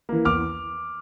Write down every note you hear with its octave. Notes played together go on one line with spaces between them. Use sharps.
E3 A#3
E2 D6 F6